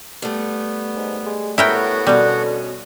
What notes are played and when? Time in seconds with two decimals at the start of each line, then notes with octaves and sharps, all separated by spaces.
0.22 G3 A3 B3
0.96 G#2
1.26 G#3
1.58 A2 B3 E4 F#4 A#4 F#5 G5
2.07 B2 D3 G3 C#4